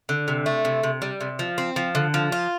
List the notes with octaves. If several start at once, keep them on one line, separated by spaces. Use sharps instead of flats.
D3
C3
A3
C3
C3
G3
C3
F3
C4
F3
D3
F3
F4